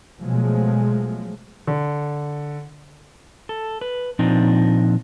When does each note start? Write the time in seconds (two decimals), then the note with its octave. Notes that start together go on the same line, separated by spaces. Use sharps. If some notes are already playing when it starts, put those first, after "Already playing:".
0.21 B2 F3 F#3 G#3 A3
1.67 D3
3.49 A4
3.81 B4
4.19 A#2 F3 C4 D4 D#4